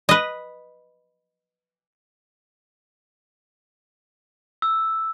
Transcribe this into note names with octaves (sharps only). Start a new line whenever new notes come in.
B4 D#5
E6